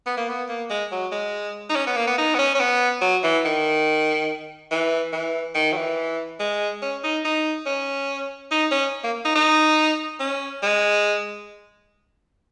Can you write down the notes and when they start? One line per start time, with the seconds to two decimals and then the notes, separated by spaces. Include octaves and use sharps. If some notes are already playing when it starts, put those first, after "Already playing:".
0.06 B3
0.17 A#3
0.29 B3
0.49 A#3
0.70 G#3
0.92 F#3
1.12 G#3
1.70 D#4
1.76 C#4
1.87 B3
1.96 A#3
2.07 B3
2.18 D#4
2.35 B3
2.39 C#4
2.55 C#4
2.60 B3
3.01 F#3
3.23 E3
3.45 D#3
4.71 E3
5.13 E3
5.55 D#3
5.72 F#3
5.77 E3
6.40 G#3
6.82 C#4
7.04 D#4
7.25 D#4
7.66 C#4
8.51 D#4
8.72 C#4
9.04 A#3
9.25 D#4
9.35 D#4
10.20 C#4
10.62 G#3